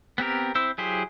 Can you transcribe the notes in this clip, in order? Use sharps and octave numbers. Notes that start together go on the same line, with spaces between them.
B3 C4 G4 A#4
C4 E4 C5 E6
F#3 E4 G4 G#4 C5